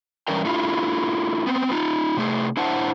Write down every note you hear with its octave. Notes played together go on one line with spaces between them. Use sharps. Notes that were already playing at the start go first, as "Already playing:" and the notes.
E3 G3 C#4 D4 A#4 G5
A3 D4 E4 F4
B3 C4
D#4 F4
C3 A3 G#4
D4 E4 C5 F#5 A5